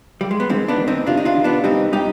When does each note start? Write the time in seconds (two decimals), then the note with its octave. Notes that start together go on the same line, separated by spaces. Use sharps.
0.21 G3
0.31 G#3
0.40 B3
0.50 D#3 G#3 C4
0.68 B3 D4
0.78 D#3
0.88 C4 D#4
1.07 C3 D4 F4
1.17 D#4
1.25 D4 F4
1.36 D#3
1.44 B3 D4
1.63 G3 C4 D#4
1.92 G3 D#4 G4